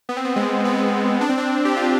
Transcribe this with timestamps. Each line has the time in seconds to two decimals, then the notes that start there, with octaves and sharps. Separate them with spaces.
0.09 B3
0.17 C4
0.25 B3
0.36 G#3
0.65 B3
1.21 D4
1.29 C4
1.38 D4
1.65 G4
1.76 F4